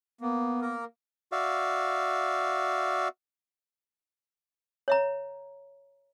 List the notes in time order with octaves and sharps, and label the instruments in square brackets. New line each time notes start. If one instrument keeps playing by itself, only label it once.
[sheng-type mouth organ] A#3 [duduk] B3
[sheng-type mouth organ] A#3 A#4
[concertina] F#4 D5 E5 F5
[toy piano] C#5 E5 A#5